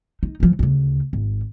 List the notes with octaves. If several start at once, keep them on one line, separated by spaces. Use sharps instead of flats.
D#4
E3 F3
D2 C#3
G#1